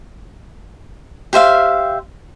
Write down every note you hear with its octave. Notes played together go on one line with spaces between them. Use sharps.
G4 C5 E5 F5